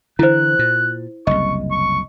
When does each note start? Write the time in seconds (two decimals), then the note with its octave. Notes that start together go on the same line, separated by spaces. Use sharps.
0.19 D3 E3 E4 C5 F#6
0.59 A#2
1.27 F#1 C2 D#5 C#6
1.71 C#6